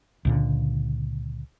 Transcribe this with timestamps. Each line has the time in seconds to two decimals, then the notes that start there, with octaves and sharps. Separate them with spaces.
0.25 C#2 A#2 D3